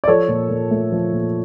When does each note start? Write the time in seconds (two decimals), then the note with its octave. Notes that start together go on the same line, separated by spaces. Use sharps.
0.04 D5
0.08 F3 A4 C#5
0.28 A#2
0.50 A#2
0.71 A3
0.92 F3
1.13 A#2